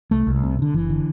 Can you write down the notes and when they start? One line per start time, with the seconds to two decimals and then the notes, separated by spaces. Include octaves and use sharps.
0.11 C2 A3
0.27 C2
0.43 C3
0.59 C3
0.62 D3
0.74 F#1 E3
0.90 D3